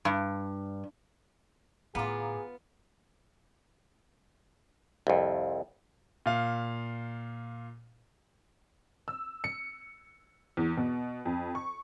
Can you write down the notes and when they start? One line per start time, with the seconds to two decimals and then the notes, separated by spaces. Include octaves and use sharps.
0.05 G2
1.95 A2 D3 B3 F4 G#4 F5 A#5 D6
5.07 C2 F2
6.26 A#2 F5
9.08 E6
9.44 C#7
10.57 E2
10.77 B2
11.26 F2
11.55 C#6